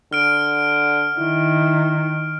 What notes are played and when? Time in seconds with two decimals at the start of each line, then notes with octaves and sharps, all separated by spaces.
0.13 D3 F6 D7
1.19 D#3 E4